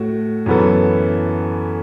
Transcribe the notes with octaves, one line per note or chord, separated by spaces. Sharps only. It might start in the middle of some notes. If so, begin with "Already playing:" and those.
Already playing: A2 A3 F#4
F#2 E3 B3 A4